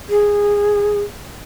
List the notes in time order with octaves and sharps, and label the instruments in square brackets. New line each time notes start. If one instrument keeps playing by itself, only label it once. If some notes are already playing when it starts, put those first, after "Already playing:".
[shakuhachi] G#4